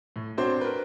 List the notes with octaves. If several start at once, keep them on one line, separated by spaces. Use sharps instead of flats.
A2
C4 D4 F#4 C5 C#5
A#4 B4